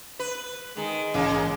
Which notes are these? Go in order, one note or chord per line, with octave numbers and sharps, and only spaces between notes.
B4
D#3 G#3
A#1 G#2 C#3 E3 A#3